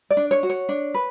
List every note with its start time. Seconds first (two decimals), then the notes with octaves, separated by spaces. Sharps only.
0.10 D5
0.17 D4
0.31 C#5
0.43 F#4
0.50 C#5
0.69 D4
0.94 B4